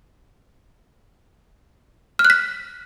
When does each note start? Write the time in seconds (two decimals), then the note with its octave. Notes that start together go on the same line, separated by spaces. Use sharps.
2.19 F6
2.25 F#6
2.30 B6